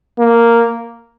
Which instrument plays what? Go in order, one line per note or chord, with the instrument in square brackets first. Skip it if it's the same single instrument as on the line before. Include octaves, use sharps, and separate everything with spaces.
[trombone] A#3